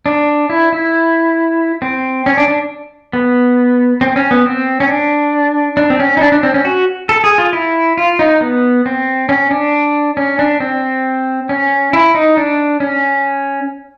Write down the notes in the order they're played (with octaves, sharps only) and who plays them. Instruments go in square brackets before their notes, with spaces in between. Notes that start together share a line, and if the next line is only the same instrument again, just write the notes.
[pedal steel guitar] D4
E4
E4
C4
C#4
D4
D4
B3
C4
C#4
B3
C4
C#4
D4
D4
C4
C#4
D#4
D4
D4
C4
C#4
F#4
A4
G#4
F4
E4
F4
D#4
B3
C4
C#4
D4
C#4
D4
C4
C#4
E4
D#4
D4
C#4